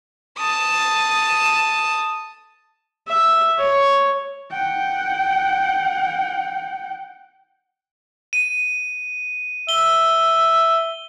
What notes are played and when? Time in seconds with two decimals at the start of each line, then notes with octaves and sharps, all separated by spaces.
0.37 A5 D#6
3.07 E5
3.57 C#5
4.51 F#5 G5
8.33 D#7
9.69 E5 G7